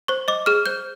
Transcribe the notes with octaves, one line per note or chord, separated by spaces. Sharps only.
C5 C#6
D#5 D6
G#4 F6
C5 G6